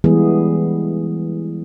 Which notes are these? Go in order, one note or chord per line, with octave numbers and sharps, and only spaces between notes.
E3 G3 G#3 B3 G#4